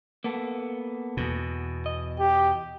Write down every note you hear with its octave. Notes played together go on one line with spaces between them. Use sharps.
A#3 B3 A4
E2 B2
D#5
G4